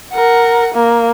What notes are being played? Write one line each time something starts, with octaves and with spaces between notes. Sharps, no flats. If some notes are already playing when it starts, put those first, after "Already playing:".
A#4 F#5
A#3